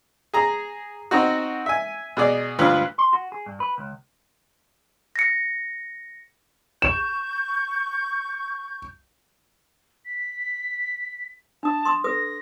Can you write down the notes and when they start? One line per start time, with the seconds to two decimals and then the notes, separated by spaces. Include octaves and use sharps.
0.34 G#4 A#5
1.11 C4 D#4 F#4
1.66 E5 G#5
2.17 B2 G#4 D5
2.59 D2 G2 F4 B4
2.98 C6
3.13 F#4
3.32 G#4
3.46 G2
3.60 B4
3.78 C#2
5.16 A#6 C#7
6.82 C#6 G6 E7
10.05 B6
11.63 D4 A5 D#6
11.85 C6 D#6
12.04 A4 B4 D#6 A#6